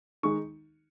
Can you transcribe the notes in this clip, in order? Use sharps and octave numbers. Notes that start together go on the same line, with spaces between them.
D#3 G#3 D#4 C#6